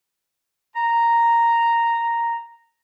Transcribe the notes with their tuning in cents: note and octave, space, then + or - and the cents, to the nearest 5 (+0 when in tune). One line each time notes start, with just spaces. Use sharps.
A#5 -5